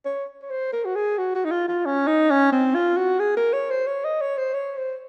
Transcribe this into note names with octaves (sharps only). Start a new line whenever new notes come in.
C#5
C#5
C5
A#4
F#4
G#4
F#4
F#4
D#4
F4
F4
C#4
D#4
C#4
C4
F4
F#4
G#4
A#4
C#5
C5
C#5
D#5
C#5
C5
C#5
C5